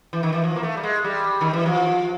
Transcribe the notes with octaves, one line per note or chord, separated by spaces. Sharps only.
E3
D#3
E3
F3
A#3
A3
G3
G#3
G3
D#3
E3
F3